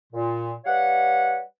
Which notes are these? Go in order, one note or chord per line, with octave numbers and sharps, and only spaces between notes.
A#2
G3 B4 C#5 F5 F#5